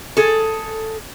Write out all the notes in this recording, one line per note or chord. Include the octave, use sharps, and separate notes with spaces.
G#4 A4